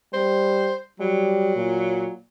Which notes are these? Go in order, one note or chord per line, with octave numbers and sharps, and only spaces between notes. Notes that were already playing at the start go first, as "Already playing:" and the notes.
G3 C5
F#3 G3
A#2